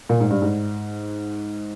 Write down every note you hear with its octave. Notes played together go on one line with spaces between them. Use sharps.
A#2
G#2
G2
G#2